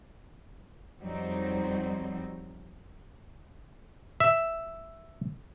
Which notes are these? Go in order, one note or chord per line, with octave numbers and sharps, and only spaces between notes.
F2 F#3 G3 C4 D#4
E5